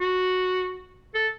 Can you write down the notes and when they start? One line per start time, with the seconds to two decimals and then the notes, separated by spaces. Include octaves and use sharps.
0.01 F#4
1.14 A4